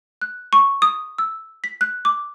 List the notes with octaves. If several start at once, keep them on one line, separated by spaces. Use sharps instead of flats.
F#6
C#6
D#6
E6
B6
F#6
D6